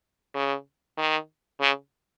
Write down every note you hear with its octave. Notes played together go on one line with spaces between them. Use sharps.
C#3
D#3
C#3